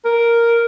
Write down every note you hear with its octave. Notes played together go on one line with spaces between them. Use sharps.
A#4